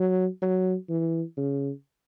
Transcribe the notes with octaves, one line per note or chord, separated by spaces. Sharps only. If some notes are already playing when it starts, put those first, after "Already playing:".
Already playing: F#3
F#3
E3
C#3